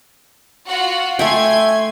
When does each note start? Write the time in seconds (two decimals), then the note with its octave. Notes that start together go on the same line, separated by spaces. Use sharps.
0.66 F4 F#4 F#5
1.19 A3 E5 G5 G#5 C6 G#6